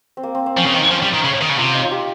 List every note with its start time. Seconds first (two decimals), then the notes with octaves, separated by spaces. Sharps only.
0.17 C4
0.23 A#3
0.35 C4
0.46 C4
0.57 F3 C#4
0.66 C#3
0.74 D#3 C4
0.91 F3 C#4
1.02 G3
1.13 D#3
1.24 C#3
1.41 D#3
1.49 C#3
1.58 C3 F4
1.75 D#4
1.84 F4
1.91 G4